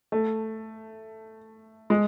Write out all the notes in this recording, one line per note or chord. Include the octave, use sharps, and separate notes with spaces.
A3
G#3